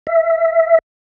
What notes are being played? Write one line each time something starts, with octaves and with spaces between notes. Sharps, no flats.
E5